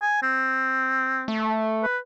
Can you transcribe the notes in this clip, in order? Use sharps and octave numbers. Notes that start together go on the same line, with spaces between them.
G#5
C4
A3
B4